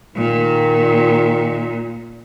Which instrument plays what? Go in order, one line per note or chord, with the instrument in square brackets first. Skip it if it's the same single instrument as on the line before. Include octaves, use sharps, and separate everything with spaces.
[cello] A#2 [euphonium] D#3